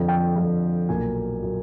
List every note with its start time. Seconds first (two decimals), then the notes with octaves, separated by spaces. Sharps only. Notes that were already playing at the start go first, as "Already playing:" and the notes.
Already playing: F2 D3 F3
0.08 G5
0.36 F2 D3 F3
0.89 B1 A#2 F#3 A#3 G#5
1.42 A#2 F#3 A#3